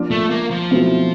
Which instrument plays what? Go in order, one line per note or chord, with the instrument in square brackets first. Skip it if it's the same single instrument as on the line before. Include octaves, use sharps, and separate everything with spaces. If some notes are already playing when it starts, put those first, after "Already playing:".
Already playing: [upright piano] F3 A#3 D4 F4
[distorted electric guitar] A3
A#3
F3
[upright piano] B2 F#3 A3 C4 E4